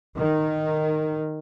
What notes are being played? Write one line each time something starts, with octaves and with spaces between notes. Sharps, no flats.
D#3